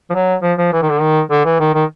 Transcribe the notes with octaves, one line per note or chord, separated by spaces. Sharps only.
F3
F#3
F3
F3
E3
D#3
D3
D#3
D3
E3
D#3
D#3